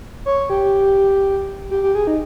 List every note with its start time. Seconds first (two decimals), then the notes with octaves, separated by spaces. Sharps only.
0.26 C#5
0.50 G4
1.71 G4
1.83 G4
1.95 G#4
2.07 D#4